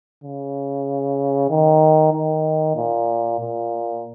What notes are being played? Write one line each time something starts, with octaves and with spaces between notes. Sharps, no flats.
C#3
D#3
D#3
A#2
A#2